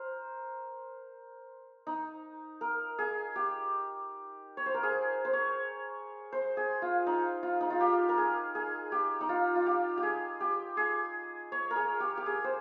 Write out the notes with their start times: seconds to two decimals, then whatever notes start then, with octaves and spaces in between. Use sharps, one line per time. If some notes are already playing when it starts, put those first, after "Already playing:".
Already playing: A#4 C5
1.87 D#4
2.61 A#4
2.98 G#4
3.36 G4
4.57 C#5
4.66 C5
4.74 A#4
4.83 G#4
5.25 C5
5.33 C#5
6.32 C5
6.57 G#4
6.82 F4
7.07 D#4
7.43 F4
7.61 D#4
7.70 F4
7.80 G4
8.09 A#4
8.17 G#4
8.55 G#4
8.92 G4
9.21 D#4
9.29 F4
9.55 F4
9.66 G4
9.97 G4
10.03 G#4
10.40 G4
10.77 G#4
11.52 C#5
11.71 A#4
11.76 G#4
12.00 G4
12.17 G4
12.26 G#4
12.44 C5